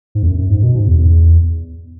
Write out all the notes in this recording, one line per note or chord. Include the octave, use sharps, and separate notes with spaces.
G#2
E2
F#2
F#2
G#2
B2
G#2
E2
E2